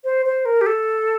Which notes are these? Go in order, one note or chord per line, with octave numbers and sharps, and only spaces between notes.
C5
C5
A#4
G4
A4